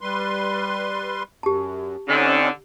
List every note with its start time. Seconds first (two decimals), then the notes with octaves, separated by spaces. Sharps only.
0.01 G3 B4 C6
1.43 F#2 G4 A5
2.08 D3 C4 C#4 D#4